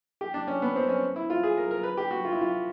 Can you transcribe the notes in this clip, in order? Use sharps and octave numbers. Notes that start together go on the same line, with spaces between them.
G4
D4
C#4
B3
C4
C#4
E4
F4
G#4
A#4
A#4
B4
G4
F#4
F4
E4
F4